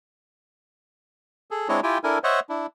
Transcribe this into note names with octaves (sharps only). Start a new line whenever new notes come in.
G#4 A4
G#3 C4 D4 E4 C#5 D#5
E4 F4 G4 G5 G#5
D4 E4 A4 A#4 G#5
C5 C#5 D#5 E5 F#5
D4 E4